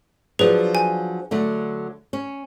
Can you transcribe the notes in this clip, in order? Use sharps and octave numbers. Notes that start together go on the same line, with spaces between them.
F3 F#3 D4 G#4 B4
G#5
D3 F#3 A3
C#4